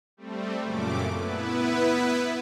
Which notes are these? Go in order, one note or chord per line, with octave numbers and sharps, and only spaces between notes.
G3 A3 C4
F#2 A#2 C#3 A3 D6
B3 E4 B4